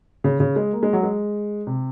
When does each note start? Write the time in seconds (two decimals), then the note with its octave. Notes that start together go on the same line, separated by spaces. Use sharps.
0.24 C#3
0.40 C#3
0.56 G#3
0.73 A#3
0.83 G#3
0.93 F#3
1.03 G#3
1.67 C3